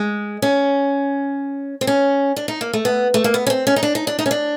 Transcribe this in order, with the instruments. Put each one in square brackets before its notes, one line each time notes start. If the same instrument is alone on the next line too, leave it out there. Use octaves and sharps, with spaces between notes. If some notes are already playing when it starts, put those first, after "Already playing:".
Already playing: [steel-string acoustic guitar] G#3
C#4
C4
C#4
D4
D#4
A#3
A3
B3
A3
A#3
B3
C#4
C4
C#4
D#4
D4
D#4
D4
D#4
C#4
D4